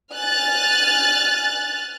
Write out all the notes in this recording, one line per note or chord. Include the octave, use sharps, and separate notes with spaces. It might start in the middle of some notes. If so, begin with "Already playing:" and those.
G#5 F6 F#6 A6